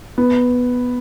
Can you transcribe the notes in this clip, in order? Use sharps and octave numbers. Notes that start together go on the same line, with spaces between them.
B3